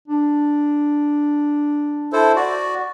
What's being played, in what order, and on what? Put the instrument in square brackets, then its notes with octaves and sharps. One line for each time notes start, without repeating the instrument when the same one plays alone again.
[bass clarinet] D4
[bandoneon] E4 A4 C5
F#4 D5